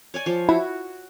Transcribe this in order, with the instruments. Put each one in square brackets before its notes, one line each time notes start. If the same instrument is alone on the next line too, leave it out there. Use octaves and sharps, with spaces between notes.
[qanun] C#5 D5 G#5
F3 C#5
[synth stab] E4 [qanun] F#4